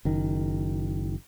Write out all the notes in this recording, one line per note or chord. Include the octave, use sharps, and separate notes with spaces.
F#1 D#3